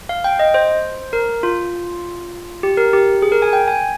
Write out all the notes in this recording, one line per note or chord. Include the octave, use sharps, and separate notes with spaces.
F5
G5
D#5
C5
A#4
F4
G4
A#4
G4
G#4
A#4
G#5
G5
G#5